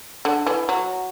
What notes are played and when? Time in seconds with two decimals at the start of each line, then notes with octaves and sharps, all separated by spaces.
0.25 D3
0.47 E3
0.69 F#3